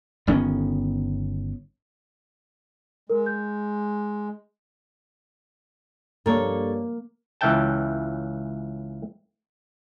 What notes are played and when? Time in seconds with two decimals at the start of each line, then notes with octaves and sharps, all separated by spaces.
0.27 G1 D#3 B3 C#4
3.10 G#3 A#4
3.26 G6
6.26 G2 A#3 A4 C#5
7.41 C#2 E3 C#4 E5 G5 A5